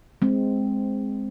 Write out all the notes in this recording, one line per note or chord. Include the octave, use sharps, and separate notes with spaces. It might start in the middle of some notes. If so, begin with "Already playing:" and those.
G#3 C4